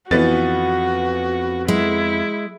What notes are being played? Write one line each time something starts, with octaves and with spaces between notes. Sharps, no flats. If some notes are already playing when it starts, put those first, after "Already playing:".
F2 E3 B3 F#4 A6
G#3 E4